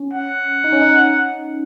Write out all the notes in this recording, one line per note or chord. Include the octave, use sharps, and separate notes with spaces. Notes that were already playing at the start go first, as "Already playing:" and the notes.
Already playing: C#4
F#5
D#4
C#4
D#4